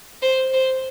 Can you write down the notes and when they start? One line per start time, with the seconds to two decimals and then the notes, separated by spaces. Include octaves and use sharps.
0.22 C5
0.53 C5